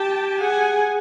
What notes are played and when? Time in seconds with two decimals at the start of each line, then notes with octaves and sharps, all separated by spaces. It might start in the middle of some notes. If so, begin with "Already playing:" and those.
Already playing: G4 G5 A5
0.41 G#4 F#5 G#5